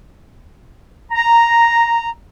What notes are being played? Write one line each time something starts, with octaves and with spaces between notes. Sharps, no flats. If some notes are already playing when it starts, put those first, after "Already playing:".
A#5